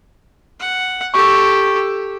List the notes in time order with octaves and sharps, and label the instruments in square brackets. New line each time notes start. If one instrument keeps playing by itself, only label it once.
[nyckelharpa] F#5
[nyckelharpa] G4 A4 [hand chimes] C#6